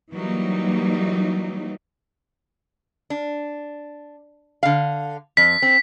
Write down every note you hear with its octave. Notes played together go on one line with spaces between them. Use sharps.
E3 F#3 G3 A#3 D#4
D4
D3 F5
F2 B6
C4